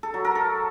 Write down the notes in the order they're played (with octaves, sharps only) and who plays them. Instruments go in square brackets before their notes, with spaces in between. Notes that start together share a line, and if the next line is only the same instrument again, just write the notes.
[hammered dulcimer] A4
F#3
A#4
A4